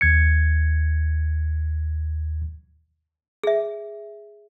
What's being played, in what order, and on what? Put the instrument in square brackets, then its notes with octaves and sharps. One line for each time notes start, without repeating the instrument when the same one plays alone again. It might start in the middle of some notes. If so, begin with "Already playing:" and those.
[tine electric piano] D#2 G#6 C#7
[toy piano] G#4 E5